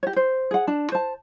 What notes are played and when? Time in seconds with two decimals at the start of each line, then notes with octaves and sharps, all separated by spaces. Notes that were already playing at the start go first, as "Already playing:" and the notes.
0.03 G4 C#5
0.16 C5
0.51 G#4 F#5
0.67 D4 A5
0.92 C5 A5